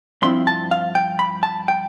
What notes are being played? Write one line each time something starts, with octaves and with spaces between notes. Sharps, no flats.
G2 F3 C4 E4 C6
A5
F5
G5
B5
A5
G5